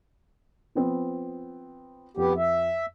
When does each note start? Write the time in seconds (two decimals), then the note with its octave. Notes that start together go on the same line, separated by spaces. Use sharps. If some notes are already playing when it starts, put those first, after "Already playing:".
0.75 F3 B3 C4
2.17 F2 B3 G4
2.38 E5